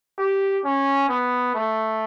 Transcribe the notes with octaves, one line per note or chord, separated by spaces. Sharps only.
G4
C#4
B3
A3